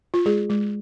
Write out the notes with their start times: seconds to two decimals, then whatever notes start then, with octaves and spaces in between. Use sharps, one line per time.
0.14 F4
0.26 G#3 G#4
0.50 G#3